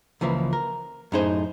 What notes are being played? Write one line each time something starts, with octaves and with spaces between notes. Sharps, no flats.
C#2 E3 F3 A#3
A#4
F#2 A2 D#4 G#4 C5